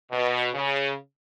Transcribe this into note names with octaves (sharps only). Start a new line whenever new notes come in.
B2
C#3